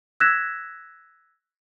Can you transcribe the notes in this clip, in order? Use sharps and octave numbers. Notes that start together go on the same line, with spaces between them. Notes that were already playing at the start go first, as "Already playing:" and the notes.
E6 F#6 G#6 A#6 B6 E7